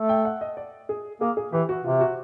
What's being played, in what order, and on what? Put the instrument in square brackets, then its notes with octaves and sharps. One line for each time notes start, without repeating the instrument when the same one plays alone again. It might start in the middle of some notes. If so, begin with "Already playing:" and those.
Already playing: [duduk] A3
[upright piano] G5
F#5
D#5
D5
G#4
[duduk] A#3 [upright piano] G#4
[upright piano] G#4
[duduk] E3 [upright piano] G4
[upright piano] F#4
[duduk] C3 [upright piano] F4
[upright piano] F#4